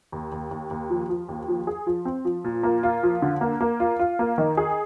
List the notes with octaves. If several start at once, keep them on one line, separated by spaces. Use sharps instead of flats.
D#2
D#2
D#2
D#2
F3
F3
D#2
F3
G#4
F3
C4
F3
A#2
A#3
F4
F3
D3
A#3
A#3
F4
F4
A#3
D#3
G#4